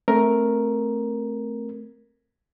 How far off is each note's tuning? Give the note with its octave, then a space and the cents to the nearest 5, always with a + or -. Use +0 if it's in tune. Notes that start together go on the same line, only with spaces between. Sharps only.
A3 +0 C4 +0 A#4 +5